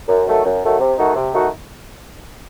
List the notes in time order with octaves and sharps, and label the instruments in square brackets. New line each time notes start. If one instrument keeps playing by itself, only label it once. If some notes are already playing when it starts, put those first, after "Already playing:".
[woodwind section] F#2
D#3 F#3 A3
F#2
D#3 F#3 A3
C3
D#3 A3 D#4 F#4
C3
D#3 A3 D#4 F#4